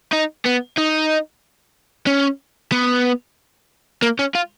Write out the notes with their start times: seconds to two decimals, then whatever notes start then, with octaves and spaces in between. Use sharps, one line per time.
0.12 D#4
0.45 B3
0.77 D#4
2.07 C#4
2.72 B3
4.02 A#3
4.19 C#4
4.35 F4